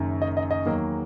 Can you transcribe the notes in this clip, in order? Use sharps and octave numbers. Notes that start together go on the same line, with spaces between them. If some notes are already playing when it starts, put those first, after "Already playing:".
Already playing: F#1 F#2 D#3
D#5
D#5
D#5
E2 D#3 F#3 A#3